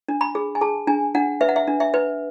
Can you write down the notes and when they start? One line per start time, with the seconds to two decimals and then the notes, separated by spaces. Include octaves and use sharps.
0.08 D4
0.21 B5
0.35 G#4
0.55 G#5
0.61 G#4 A5
0.87 D4 G#5
1.15 D4 F#5
1.41 B4 E5
1.49 F#5
1.56 E5
1.67 D4
1.80 E5
1.94 B4